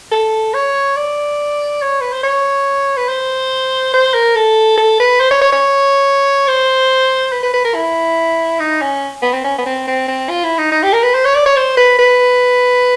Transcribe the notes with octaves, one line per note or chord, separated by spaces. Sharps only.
A4
C#5
D5
C#5
B4
C5
C#5
B4
C5
C5
A#4
A4
A4
B4
C5
C#5
C#5
C#5
C5
B4
B4
B4
A#4
E4
D#4
C#4
B3
C4
C#4
B3
C4
C4
C4
F4
E4
D#4
D#4
G4
A#4
B4
C5
C#5
D5
C#5
C5
B4
B4